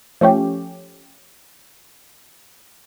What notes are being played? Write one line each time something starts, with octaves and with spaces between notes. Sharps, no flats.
F3 A3 C#4 G4